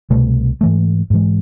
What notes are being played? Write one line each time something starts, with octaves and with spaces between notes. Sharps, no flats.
C2 B2 A3
G#2 E3 A3
G#2 E3 G#3